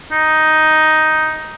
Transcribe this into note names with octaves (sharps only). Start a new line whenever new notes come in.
D#4